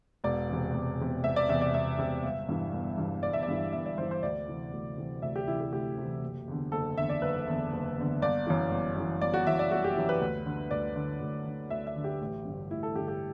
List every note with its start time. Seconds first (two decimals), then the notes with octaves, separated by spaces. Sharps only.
0.24 E1 D5
0.49 E2 C3
0.74 E1
0.99 E2 C3
1.24 E1 E5
1.36 D5
1.49 E2 C3 E5
1.61 D5
1.74 E1 E5
1.99 E2 C3
2.23 G1
2.49 G2 E3
2.74 G1
2.98 G2 E3
3.23 G1 D5
3.33 E5
3.43 D5
3.48 G2 E3
3.73 G1 E5
3.86 D5
3.98 G2 E3 C5
4.11 C5
4.23 D2 D5
4.48 C3 E3
4.73 D2
4.97 C3 E3
5.22 D2 E5
5.36 G4
5.47 C3 E3 E4
5.61 G4
5.72 D2 G4
5.97 C3 E3
6.22 F#1
6.48 E2 D3
6.72 F#1 A4
6.97 E2 D3 E5
7.09 D5
7.22 F#1 B4
7.47 E2 D3
7.72 F#1
7.97 E2 D3
8.22 G1 D5
8.47 F#2 E3
8.71 G1
8.96 F#2 E3
9.21 G1 D5
9.34 F#4
9.47 F#2 E3 E5
9.59 D5
9.71 G1 F#4
9.84 G4
9.96 F#2 E3
10.09 B4
10.21 D2
10.46 D3
10.71 D2 D5
10.96 D3
11.21 D2
11.46 D3
11.70 D2 E5
11.87 E5
11.96 D3
12.04 G4
12.21 A1
12.45 G2 D3
12.70 A1 E4
12.83 A4
12.95 G2 G4
12.99 D3
13.08 G4